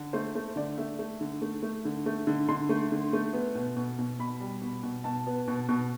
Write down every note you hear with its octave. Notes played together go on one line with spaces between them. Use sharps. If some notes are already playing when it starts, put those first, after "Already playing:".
Already playing: D3
A3 C5
A3
D3 D5
A3 E5
A3
D3
A3
A3
D3
A3
D3
D3 C6
A3
D3
A3
B3
B2
B2
B2
B2 B5
G3
B2
B2
B2 A5
B3
B2
B2